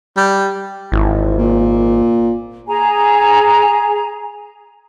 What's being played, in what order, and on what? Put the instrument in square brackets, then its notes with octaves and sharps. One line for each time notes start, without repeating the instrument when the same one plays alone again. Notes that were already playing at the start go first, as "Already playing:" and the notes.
[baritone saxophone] G3
[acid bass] G#1 [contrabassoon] E3
[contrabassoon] A#2
[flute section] G#4 G#5 A#5